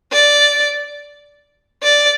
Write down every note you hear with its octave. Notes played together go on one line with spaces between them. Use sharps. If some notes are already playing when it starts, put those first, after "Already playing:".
D5
D5